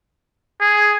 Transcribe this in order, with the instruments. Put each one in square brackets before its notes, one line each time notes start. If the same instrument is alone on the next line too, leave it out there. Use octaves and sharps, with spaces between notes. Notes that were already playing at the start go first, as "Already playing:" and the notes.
[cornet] G#4